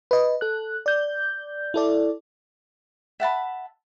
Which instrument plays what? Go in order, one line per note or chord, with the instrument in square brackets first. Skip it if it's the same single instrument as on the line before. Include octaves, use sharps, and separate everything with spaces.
[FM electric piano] B4 D#5
A4 F#6
D5 G6
E4 A4 D5
[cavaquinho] E5 F#5 A5 B5